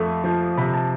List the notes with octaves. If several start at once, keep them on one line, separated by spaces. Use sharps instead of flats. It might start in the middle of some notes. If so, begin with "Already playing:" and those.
Already playing: F2 A3
F3
C3 B5
A5